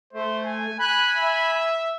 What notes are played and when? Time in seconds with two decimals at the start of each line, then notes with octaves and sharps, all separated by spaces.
0.13 A3 C5
0.45 G#5
0.80 G#5 B5 F#6
1.16 E5